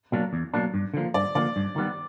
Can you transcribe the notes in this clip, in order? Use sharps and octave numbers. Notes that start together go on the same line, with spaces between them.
B2 F#3 A#3 D4
E2
B2 F#3 A#3 D4
G2
D3 F3 A#3
G2 D5
D3 F3 A#3 D5
G2
D#3 G3 B3